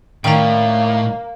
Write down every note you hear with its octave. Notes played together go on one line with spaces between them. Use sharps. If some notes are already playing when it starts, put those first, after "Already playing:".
A2 D#3 A#3 C#4 D5 G5 A#5